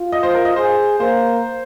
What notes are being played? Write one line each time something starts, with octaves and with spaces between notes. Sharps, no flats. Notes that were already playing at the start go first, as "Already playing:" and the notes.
Already playing: F4
D#5
C5
A#4
D#5
G#4 C5
A#3 C5